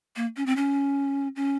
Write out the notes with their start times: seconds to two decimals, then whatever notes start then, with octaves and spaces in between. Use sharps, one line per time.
0.16 A#3
0.37 C#4
0.46 C4
0.56 C#4
1.36 C#4